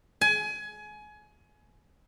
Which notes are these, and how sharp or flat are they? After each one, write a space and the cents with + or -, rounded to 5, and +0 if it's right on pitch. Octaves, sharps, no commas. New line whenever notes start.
G#5 +25